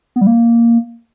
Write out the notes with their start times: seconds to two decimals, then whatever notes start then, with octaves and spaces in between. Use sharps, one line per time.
0.16 B3
0.21 G3
0.27 A#3